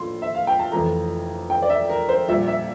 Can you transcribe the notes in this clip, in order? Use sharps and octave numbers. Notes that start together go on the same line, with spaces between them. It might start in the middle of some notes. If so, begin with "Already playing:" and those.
Already playing: A#1 A2 C6
E5
F5
G5
A5
F1 F2 E3 A3 A#5
G5
D5
E5
A#4
C5
A#1 A#2 G3 E5
E5